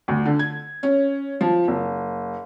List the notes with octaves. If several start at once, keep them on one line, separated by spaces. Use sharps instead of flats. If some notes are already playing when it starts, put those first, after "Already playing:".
D2
D3
G#6
C#4
F3
F#1